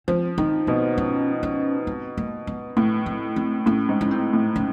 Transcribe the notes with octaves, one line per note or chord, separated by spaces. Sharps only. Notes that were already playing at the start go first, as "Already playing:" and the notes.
F3 C4
D#3 C4
B2 C4
C#4
C#4
C4
A#3
B3
A2 C4
C4
C4
A2 C#4
G#2
C#4
C4
A2
C#4